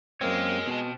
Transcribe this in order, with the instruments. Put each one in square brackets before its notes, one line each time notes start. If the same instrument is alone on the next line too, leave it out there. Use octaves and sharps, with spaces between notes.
[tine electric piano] F#2 A#3 C4 [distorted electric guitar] G#3 [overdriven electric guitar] A#4 C#5
[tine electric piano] B2 [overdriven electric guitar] C4 A5